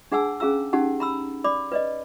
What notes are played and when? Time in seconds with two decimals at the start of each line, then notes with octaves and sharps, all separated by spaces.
0.12 D4 G#4 F#5 G#5 A5 E6
0.40 C#4 G#4 F5 A#5 E6
0.73 C#4 D#4 G4 F#5 A5
1.00 A#5 B5 E6
1.44 D5 B5 D6
1.72 B4 D5 D#5